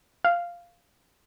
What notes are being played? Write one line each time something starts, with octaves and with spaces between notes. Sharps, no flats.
F5